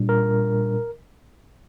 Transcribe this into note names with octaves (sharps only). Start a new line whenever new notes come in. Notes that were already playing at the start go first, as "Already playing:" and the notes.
Already playing: A#2 G3 D4
A#4